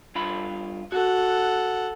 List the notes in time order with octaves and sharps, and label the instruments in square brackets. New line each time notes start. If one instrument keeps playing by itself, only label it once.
[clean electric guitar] G2 F4 B5
[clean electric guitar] F#4 [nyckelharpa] A4 F#5